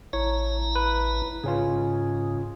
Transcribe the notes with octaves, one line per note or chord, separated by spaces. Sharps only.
A1 E4 C#5 A#5
B4
G#2 C#3 C#4 F4